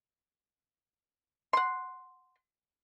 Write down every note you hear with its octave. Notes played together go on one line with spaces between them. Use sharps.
F#5 C6